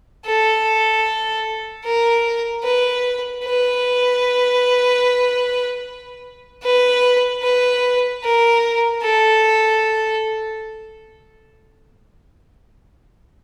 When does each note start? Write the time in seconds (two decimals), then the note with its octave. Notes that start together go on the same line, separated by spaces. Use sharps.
0.26 A4
1.84 A#4
2.64 B4
3.44 B4
6.63 B4
7.43 B4
8.23 A#4
9.03 A4